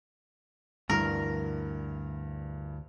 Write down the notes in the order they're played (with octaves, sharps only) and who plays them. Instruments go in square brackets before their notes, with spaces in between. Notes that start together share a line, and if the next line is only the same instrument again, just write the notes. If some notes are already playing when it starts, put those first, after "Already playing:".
[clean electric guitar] D2 [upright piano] G2 E3 [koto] A#4